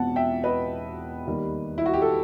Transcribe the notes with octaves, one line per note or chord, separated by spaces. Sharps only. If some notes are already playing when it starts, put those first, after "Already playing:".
Already playing: E1 E2 C3 E3 B3 F#5 A5
E5 G5
B4 D#5
D#2 D#3 G3
E4
F#4
G4
A4